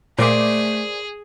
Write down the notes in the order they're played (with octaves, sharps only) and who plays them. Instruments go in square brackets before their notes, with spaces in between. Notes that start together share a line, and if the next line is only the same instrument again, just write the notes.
[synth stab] A#2 D6 [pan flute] A3 [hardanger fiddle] G#4 [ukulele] A#4 C5 D5